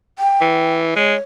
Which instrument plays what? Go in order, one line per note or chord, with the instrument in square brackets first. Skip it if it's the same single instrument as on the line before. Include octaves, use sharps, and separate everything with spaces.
[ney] G5
[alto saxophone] E3
[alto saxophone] G#3 [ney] C#5